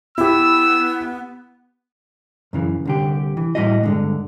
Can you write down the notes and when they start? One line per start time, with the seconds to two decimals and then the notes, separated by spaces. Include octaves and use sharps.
0.18 B3 E4 G4 E6
2.53 F#2 C#3 E3
2.85 C2 D3 G4
3.37 E3
3.55 A2 G3 E4 F#4 D#5
3.83 G2 D3 G#3